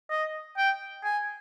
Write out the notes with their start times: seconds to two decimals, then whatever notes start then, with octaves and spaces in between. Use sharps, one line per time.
0.10 D#5
0.57 G5
1.04 G#5